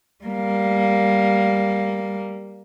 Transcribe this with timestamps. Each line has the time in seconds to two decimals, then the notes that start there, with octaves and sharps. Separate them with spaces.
0.24 G3 A#3